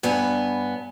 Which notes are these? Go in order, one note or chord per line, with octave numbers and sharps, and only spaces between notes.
G2 B3 C#5 G#5